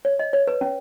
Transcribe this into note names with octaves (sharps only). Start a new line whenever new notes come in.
C#5
D#5
C#5
B4
C#4